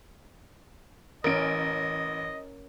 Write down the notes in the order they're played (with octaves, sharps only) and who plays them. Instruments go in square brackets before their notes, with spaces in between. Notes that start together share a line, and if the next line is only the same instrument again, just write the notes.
[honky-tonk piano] A1 D7 [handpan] C#4 A#4 [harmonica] D#5